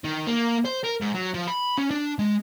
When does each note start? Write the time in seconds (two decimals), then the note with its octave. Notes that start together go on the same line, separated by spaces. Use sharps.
0.04 D#3
0.27 A#3
0.65 C5
0.84 A#4
1.01 G#2
1.14 F#3
1.34 F3
1.48 B5
1.78 C#4
1.91 D4
2.19 G#3